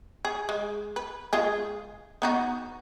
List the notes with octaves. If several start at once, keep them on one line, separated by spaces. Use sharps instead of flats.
G#4
G#3
B4
G#3 F4 G#4
B3 D#4 F#4